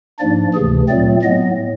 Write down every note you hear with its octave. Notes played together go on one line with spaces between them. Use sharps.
G#2 F3 A#3 D4 D5
D2 C3 E3 G#4
A#2 F#3 A3 C4 D5
A2 F#3 B3 D#5